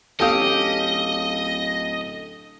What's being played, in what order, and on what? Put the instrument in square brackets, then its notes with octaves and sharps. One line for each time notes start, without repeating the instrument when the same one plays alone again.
[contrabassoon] D1 [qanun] C#4 G4 [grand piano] A4 F5 D#6 [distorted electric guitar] D#5